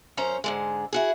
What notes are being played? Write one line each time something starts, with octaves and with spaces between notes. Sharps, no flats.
F#2 C#4 C5 A#5
G#2 D3 G#3
E4 F#4 G#4